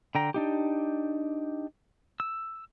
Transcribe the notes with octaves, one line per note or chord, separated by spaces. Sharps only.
D3 G5 A#5
D4 D#4 G4
E6